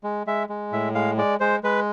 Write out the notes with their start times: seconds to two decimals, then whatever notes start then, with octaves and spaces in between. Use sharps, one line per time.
0.03 G#3
0.27 G#3 E5
0.49 G#3
0.72 A2 E5
0.95 G#3 F5
1.17 G#3 D5
1.40 G#3 C5
1.63 G#3 B4